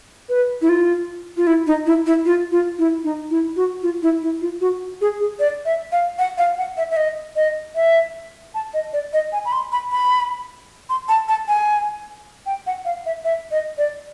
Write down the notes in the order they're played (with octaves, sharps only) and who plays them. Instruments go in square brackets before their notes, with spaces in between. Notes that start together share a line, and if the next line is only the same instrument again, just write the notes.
[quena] B4
E4
F4
F4
E4
D#4
E4
E4
F4
F4
E4
D#4
E4
F#4
F4
E4
E4
F4
F#4
G#4
G#4
D5
E5
F5
F#5
F5
F#5
E5
E5
D#5
D#5
E5
A5
D#5
D5
D#5
G#5
B5
C6
B5
B5
C6
A5
A5
G#5
G5
F#5
F5
E5
E5
D#5
D5